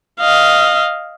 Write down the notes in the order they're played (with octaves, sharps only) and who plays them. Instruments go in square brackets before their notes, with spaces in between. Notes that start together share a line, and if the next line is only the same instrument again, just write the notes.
[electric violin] D#5 F5